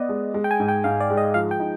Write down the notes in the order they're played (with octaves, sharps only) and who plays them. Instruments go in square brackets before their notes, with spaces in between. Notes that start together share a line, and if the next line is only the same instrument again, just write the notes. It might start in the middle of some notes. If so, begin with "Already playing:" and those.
Already playing: [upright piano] B3 [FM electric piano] D5 D#5
[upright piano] G#3
G#3
[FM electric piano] G5
G#5
[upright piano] G#2
[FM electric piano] G5
[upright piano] G#2 [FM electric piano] F5
[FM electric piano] D5
[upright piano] G#3
[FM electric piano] D#5
[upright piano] F3 [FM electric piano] F5
[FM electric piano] G5
[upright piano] D#4